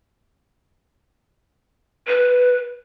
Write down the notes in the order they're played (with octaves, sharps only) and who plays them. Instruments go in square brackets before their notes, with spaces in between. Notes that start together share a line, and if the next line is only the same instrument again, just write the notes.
[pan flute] B4